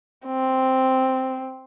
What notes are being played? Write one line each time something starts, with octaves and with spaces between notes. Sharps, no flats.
C4